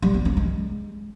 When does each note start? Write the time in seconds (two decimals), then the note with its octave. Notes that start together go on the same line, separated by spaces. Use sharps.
0.02 G3
0.14 B3
0.25 C#4
0.37 G#3